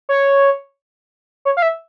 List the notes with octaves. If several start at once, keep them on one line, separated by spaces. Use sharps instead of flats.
C#5
C#5
F5
E5